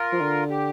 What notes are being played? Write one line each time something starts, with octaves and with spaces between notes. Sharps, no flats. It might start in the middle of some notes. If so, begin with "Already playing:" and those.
Already playing: F4 A#4
F3
D3
G4